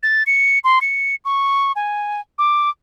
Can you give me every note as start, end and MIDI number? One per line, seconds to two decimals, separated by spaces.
0.03 0.23 93
0.26 0.59 97
0.64 0.79 84
0.81 1.15 97
1.25 1.72 85
1.76 2.21 80
2.38 2.69 86